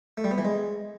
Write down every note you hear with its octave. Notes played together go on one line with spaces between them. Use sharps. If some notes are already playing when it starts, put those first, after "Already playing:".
A3
G3
B3
E3
G#3